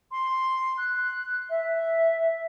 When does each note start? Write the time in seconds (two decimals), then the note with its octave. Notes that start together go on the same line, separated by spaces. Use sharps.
0.11 C6
0.77 F#6
1.49 E5